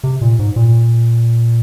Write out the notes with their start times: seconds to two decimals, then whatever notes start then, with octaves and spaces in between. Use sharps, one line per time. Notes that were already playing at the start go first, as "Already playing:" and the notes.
0.04 C3
0.21 A#2
0.39 G#2
0.56 A#2